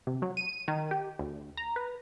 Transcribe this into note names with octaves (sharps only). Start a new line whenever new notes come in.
C3
F#3
D#7
D#3
G4
D2
A#5
B4